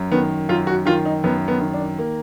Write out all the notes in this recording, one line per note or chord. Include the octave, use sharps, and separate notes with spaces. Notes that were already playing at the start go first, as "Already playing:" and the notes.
Already playing: F#2
D#3 B3
F#2 F4
F#4
D#3 F4
D#4
F#2 B3
B3
D#3
D4
A#3